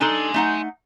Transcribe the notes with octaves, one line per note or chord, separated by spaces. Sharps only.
D4 D#4 A4 G#5 C6
A3 D#4 F#5